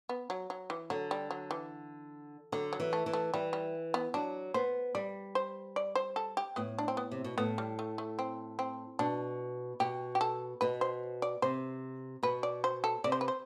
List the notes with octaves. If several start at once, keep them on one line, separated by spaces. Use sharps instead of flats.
B3
F#3
F#3
E3
D3 F#3
G3
F#3
E3
D3 F#3
F#3
E3
A3
E3
A3
E3 G3
G3
B3
F#3 D4
B3 C5
G3 D5
C5
D5
C5
A4
G4
A2 B3
D4
C4
B3
C3
B2
A2 B3
G3
A3
A3
C4
C4
B2 D4
B2 G4
G4
A4
B2 B4
C5
D5
C3 C5
B2 B4
D5
C5
A4
C3 D5
C5
B4
C5